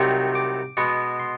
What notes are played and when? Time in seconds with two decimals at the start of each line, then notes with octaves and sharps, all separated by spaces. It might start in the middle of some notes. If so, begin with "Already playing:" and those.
Already playing: C2 C3 D#3 F#3 A3 C#6
0.35 D6
0.77 B2 G#3 B3 C#6
1.19 C6